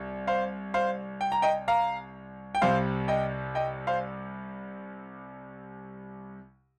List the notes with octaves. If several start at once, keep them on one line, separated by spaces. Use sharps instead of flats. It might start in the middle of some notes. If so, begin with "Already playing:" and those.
Already playing: C2
C5 F5
C5 F5
G5
A#5
D#5 G5
F5 A#5
G5
C2 C3 G3 C5 F5
D#5 G5
D#5 G5
C5 F5